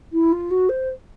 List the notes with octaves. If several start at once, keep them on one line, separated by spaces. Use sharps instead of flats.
E4
F4
F#4
C5